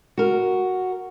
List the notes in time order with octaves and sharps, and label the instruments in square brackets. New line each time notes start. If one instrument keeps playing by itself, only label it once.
[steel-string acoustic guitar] F#4 A#4